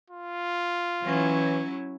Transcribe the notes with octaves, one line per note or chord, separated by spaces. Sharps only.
F4
E3 F#3 C#4 E4